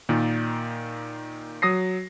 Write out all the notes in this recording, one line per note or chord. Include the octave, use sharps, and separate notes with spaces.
A#2 D#3
F#3 D#6 A#6 C7